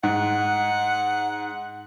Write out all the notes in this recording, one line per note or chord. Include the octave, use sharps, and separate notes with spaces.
G#2 F#5